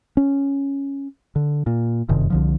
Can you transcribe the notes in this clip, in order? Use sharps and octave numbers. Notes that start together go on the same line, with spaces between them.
C#4
D3
A#2
F1 F#2 C3 D#3
C2 D3 F3